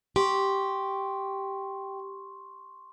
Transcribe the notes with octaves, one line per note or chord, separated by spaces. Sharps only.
G4 C6 C#6